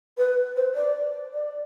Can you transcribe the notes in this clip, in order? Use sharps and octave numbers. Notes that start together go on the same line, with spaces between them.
B4
C5
D5
D5